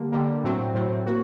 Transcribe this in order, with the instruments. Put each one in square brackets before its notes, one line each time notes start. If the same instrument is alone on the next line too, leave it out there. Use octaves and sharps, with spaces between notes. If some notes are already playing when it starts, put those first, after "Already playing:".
Already playing: [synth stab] D3 G3 A#3
D3 G3 A#3
A2 F#3 C4
A2 F#3 C4
A#3 F#4